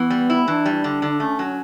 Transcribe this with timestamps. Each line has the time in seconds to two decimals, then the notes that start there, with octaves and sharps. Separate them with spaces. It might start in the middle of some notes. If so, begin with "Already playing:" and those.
Already playing: E3 B3
0.10 G3
0.30 E4
0.48 E3 D4
0.66 G3
0.84 D3
1.02 D3
1.20 A3 C#4
1.39 F#3